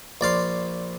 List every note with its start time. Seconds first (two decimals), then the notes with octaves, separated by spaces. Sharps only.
0.21 A#1 D5 F5 C6